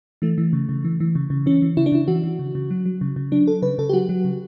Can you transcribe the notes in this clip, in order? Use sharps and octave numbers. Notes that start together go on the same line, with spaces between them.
E3 A3
E3
C#3
C#3
E3
E3
C#3
C#3
E3 C#4
E3
C#3 E4
D4
C#3 E4
E3 F#4
E3
C#3
C#3
F#3
F#3
C#3
C#3
F#3 D4
F#3 A4
C#3 B4
C#3 A4
G4
F#3 F#4
F#3
C#3